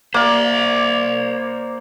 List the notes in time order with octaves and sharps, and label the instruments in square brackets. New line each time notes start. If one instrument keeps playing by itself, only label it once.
[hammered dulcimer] A#3 [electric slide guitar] C5 D5